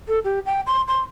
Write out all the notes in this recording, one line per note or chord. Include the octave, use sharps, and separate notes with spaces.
A4
G4
G5
C6
C6